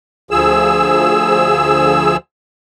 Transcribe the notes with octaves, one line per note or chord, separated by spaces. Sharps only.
D2 F3 G#4 E6